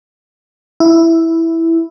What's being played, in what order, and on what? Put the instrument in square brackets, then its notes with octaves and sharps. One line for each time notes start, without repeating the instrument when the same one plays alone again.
[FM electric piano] E4